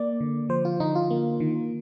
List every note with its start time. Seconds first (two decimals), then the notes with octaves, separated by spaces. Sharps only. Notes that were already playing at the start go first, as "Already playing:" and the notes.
Already playing: A#3 D5
0.20 D3
0.49 F3 C5
0.65 F4
0.80 D3 D#4
0.95 F4
1.10 A#3
1.40 D#3